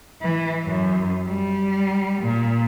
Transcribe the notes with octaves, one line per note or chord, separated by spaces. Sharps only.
E3
F#2
G3
A#2